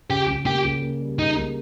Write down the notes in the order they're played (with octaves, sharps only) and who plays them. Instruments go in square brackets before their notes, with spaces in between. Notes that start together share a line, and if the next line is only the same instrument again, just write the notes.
[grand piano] C#3 [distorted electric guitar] G4
[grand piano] C#3
[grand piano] A#3 [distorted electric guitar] G4
[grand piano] C#3
A#3
G3
[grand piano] G3 [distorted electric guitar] D#4
[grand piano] A#3